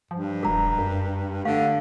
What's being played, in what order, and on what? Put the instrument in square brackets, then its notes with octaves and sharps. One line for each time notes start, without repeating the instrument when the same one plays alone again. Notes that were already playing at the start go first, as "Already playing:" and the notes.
[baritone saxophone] G2 [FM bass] F3
[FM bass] E1 [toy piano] A#4 A#5
[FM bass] F#2
[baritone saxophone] D3 [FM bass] A3 [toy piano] F5